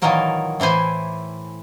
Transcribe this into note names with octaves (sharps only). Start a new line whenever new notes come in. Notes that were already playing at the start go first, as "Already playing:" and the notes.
A#2 D#3 E3 F#3 A#4 A5
A2 E3 E4 C5 G#5